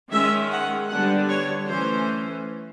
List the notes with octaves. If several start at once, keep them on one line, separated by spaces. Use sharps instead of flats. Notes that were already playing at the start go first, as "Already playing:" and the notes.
D#3 G#3 C#4 E5
F#5
D3 G3 B3 D4 F#5
C#5
E3 A3 C#4 C5